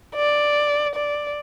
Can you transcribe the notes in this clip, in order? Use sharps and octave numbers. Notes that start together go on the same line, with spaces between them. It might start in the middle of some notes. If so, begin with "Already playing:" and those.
D5
D5